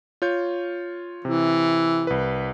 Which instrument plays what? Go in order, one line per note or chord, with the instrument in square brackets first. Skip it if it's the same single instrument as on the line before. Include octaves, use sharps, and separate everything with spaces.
[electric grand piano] F4 C#5 G6
[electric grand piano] C3 [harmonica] E3
[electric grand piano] C2 B4